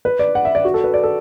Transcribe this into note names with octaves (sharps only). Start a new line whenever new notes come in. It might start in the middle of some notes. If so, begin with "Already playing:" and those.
B4
D5
F#5
E5
D5
F#4
A4
B4
D5
A4